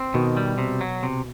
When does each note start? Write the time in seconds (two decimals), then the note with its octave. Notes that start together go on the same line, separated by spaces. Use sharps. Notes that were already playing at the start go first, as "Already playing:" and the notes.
Already playing: C4
0.14 B2 D#3
0.37 G3
0.58 C3
0.81 F#3
1.03 C3